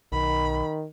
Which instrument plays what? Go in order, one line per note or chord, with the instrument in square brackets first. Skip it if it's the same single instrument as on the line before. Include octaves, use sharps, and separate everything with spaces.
[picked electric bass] B1 [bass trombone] D#3 [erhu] B5